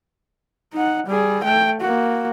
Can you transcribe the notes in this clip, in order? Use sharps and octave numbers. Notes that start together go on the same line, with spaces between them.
D#4 F#5
G3 G#4
A3 G5
A#3 F#4